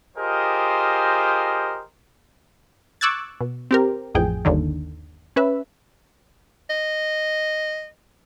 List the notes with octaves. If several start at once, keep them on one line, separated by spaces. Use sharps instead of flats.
F4 G4 G#4 A#4 C5 D#5
C#6 D6 E6 F#6 G#6 A6
B2
C4 G4 A#4
A1 F2 G#4 G5
G1 D#2 D3 D#3
C#4 B4 E5
D#5